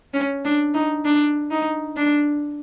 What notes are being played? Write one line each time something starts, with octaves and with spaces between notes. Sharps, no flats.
C#4
D4
D#4
D4
D#4
D4